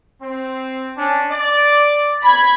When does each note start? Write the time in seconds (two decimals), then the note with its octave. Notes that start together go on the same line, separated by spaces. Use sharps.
0.20 C4
0.96 C#4 D4
1.29 D5
2.24 B5 G#6